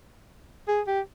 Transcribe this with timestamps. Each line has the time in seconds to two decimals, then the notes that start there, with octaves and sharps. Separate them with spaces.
0.68 G#4
0.87 G4